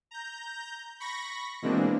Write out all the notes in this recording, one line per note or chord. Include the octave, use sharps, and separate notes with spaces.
A#5 G6
B5 C#6 A#6
B2 E3 G#3 A#3 C4 D4